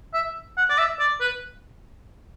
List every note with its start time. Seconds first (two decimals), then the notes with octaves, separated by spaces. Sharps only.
0.14 E5
0.58 F#5
0.69 D5
0.78 E5
0.99 D5
1.20 B4